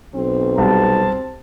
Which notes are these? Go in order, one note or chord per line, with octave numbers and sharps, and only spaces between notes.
B1 C4
C2 A5